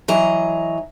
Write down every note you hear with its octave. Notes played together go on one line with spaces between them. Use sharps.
E3 F#3 D#5 A#5